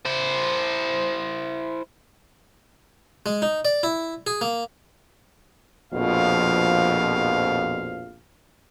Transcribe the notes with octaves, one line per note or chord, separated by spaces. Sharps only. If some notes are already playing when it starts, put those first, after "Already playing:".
E4 C5
G#3
D#4
D5
E4
G#4
A#3
A#1 F2 B2 F3 F5